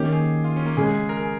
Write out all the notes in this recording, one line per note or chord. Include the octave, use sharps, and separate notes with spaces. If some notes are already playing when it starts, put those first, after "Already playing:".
Already playing: D#3 A#3 C#4 G4
G#4
F4
C#4
A#3
C#3 G#3 C#4 G#4
G#4
A#4
G#4